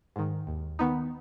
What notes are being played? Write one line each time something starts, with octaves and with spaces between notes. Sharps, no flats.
G#2 D#3
D#2
D#3 B3 D#4